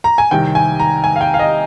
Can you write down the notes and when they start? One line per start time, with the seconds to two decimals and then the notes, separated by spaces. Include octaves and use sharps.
0.04 A#5
0.18 G#5
0.31 C2 C3 D#3 G5
0.55 G#5
0.80 A#5
1.04 G#5
1.16 F5
1.21 G5
1.34 F5
1.39 D#5